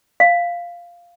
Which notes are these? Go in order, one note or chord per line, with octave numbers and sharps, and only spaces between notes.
F5